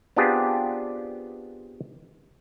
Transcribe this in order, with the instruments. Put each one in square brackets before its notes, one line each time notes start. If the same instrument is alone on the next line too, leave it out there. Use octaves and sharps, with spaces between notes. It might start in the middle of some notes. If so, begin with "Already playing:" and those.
[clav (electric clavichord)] B3 C4 D4 F4 G4 G#4